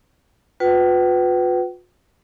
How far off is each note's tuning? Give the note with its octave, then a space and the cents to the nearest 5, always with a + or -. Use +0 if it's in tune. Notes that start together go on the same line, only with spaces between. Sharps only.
F4 +45 B4 +15 G5 -45